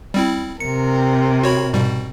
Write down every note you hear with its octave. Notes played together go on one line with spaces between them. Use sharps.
G3 C4 E4
C3 A#4 C#7
F#4 C#5 B5
G#2 B2 G3